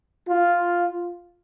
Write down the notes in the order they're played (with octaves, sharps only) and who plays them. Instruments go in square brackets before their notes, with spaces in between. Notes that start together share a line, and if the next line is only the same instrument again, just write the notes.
[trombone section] F4